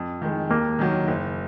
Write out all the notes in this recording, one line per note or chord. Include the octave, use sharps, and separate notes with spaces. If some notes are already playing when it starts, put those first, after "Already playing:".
Already playing: F2
D#3 G#3
D#2 A#3
D#3 F#3
F#1